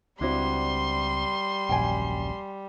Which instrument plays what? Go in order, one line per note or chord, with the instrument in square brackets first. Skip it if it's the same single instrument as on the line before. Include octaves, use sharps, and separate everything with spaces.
[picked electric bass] C#2 C4 [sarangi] G3 [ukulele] D4 E4 F#4 [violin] C6
[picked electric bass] D#1 A#1 F#2 [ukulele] G5 G#5